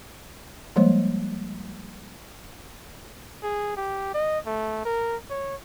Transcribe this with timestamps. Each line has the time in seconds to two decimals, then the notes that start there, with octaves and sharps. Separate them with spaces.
0.76 F3 G3 G#3 A#3 C5 C#5
3.43 G#4
3.77 G4
4.14 D#5
4.47 A3
4.85 A#4
5.30 C#5